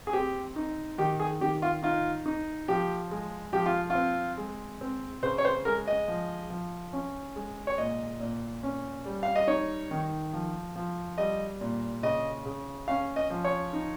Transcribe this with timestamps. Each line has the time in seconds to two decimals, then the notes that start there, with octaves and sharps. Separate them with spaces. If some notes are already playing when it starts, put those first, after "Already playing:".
0.07 G#4
0.13 C4 G4
0.56 D#4
0.98 D#3 G4
1.20 G#4
1.41 D#3 G4
1.62 F4
1.83 D#4 F4
2.26 D#4
2.68 F3 G4
3.11 G#3
3.53 F3 G4
3.66 F4
3.90 F4
3.95 C4
4.38 G#3
4.81 C4
5.23 C#3 C5
5.38 C#5
5.45 C5
5.65 G#3 A#4
5.87 D#5
6.08 F3
6.50 F3
6.93 C#4
7.36 G#3
7.67 C#5
7.78 A#2 D#5
8.20 A#2
8.63 C#4
9.06 G3
9.23 F5
9.35 D#5
9.48 D#4 C#5
9.91 D#3
10.33 F3
10.76 F3
11.18 G3 D#5
11.61 A#2
12.03 C#3 D#5
12.46 C#3
12.88 C#4 F5
13.16 D#5
13.30 F3
13.45 C#5
13.73 D#4